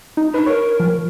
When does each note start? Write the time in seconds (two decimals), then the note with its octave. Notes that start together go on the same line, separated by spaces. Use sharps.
0.17 D#4
0.34 D4 B4
0.46 A#4 C#5
0.80 F3